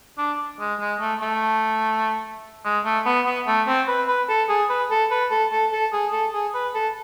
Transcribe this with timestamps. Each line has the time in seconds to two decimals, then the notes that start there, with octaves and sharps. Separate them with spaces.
0.18 D4
0.60 G#3
0.80 G#3
1.00 A3
1.21 A3
2.65 G#3
2.85 A3
3.06 B3
3.26 B3
3.47 A3
3.67 C4
3.88 B4
4.08 B4
4.28 A4
4.49 G#4
4.70 B4
4.90 A4
5.11 B4
5.31 A4
5.51 A4
5.72 A4
5.93 G#4
6.12 A4
6.33 G#4
6.54 B4
6.74 A4